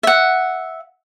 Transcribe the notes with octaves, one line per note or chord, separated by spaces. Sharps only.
E5 F#5